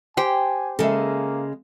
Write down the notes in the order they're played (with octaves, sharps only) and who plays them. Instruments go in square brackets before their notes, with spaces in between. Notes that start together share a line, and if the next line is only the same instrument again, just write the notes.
[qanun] G4 C5 G5 [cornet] G#5
[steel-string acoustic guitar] C#3 G#3 [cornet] A#3 [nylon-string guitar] A4 E5